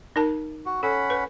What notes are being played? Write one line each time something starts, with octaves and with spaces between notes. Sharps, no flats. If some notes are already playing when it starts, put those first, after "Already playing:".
D#4 A#4 A5
F#4
C#4 A4 F#5 B5
B4